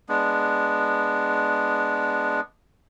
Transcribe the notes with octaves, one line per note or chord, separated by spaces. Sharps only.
G#3 B3 D4